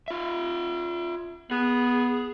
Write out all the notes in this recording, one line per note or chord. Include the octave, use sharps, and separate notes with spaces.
F4 E5
B3 G#4